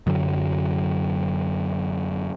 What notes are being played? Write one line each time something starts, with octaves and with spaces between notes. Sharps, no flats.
F#2 D3 F#3